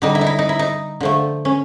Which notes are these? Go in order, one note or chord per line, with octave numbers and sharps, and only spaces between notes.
D3 G3 D#4
E4
D#4
E4
D#4
E4
D#4
D3 F3 A3
C#4